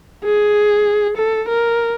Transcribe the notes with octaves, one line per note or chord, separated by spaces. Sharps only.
G#4
A4
A#4